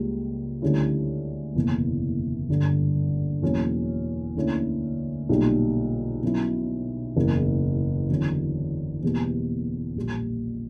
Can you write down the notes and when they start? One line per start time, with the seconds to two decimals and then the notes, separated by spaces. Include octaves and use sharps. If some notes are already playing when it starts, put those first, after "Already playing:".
Already playing: C#2 C#3 G3 A#3
0.62 D2 D3 G3 C#4 E4
1.55 F#1 E2 B2 A#3 E4
2.49 G1 G2 D3
3.42 E2 B2 F#3 A#3 C#4
4.36 D2 D3 A#3 C#4 E4
5.29 B1 A#2 G3
6.23 B1 B2 F#3 C#4 E4
7.16 F#1 E2 C#3 E3
8.09 E2 D3 F#3 C#4
9.03 E2 B2 G3 A#3
9.96 A#1 A#2 G3